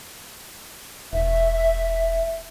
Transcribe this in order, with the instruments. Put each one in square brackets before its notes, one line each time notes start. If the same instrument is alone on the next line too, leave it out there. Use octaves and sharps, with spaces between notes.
[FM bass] E1 [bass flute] E5